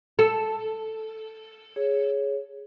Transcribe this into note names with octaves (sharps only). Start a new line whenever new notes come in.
A4
G#4 C#5